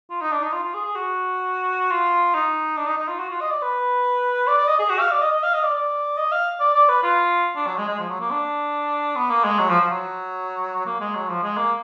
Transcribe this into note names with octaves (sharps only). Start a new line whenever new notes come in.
F4
D#4
D4
D#4
F4
F4
G#4
G#4
F#4
F4
D#4
D4
D#4
D#4
F4
F#4
F4
D#5
D5
B4
D5
D5
D#5
G#4
F#4
F5
D5
D#5
D#5
F5
D#5
D5
D5
D#5
F5
D5
D5
B4
F4
D4
F#3
G#3
G#3
F3
F#3
A#3
D4
B3
A#3
G#3
F#3
F3
F3
F#3
A#3
G#3
F#3
F3
G#3
A#3